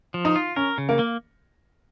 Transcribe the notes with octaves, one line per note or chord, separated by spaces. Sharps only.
F3
D#4
F4
C#4 A#4
C#3
A#3
A#3